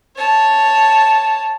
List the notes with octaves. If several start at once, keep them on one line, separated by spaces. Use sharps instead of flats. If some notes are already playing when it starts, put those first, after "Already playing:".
C#5 A5